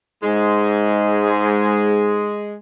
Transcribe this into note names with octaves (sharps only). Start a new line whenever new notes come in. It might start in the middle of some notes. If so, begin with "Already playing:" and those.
G#2 G#3